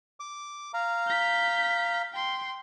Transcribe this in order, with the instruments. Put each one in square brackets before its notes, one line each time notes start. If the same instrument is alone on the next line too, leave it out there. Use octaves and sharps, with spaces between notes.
[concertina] D6
F5 A#5
[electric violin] G6 B6
G5 C6